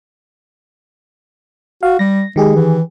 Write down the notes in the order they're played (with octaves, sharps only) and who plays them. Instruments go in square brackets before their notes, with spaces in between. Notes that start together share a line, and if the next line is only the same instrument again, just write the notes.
[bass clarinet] F#4 [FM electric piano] F5
[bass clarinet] G3 [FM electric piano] A#6
[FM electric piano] D#3 G4 G#4 [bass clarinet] G#3
[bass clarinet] E3